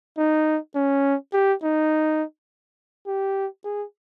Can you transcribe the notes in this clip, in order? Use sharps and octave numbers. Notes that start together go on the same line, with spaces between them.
D#4
C#4
G4
D#4
G4
G#4